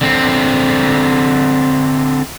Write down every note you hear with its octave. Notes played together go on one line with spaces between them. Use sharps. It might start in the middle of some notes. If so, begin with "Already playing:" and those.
D3 C4